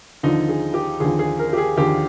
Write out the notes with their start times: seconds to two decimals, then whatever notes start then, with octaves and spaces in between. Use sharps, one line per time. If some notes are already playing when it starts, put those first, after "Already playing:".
0.23 D#2 D3 F3 D#4
0.49 G#4
0.74 G4
1.00 D#2 D3 F3 G#4
1.19 G#4
1.39 A#4
1.53 G4
1.57 G#4
1.77 D#2 D3 F3 G4